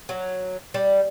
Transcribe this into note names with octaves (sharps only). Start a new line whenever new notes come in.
F#3
G3